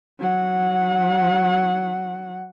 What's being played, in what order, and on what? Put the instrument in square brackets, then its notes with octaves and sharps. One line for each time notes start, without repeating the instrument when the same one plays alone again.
[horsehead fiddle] F#3 F#5